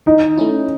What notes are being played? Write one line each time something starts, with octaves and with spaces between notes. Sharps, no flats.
D#3 D#4
A3 C#4 E4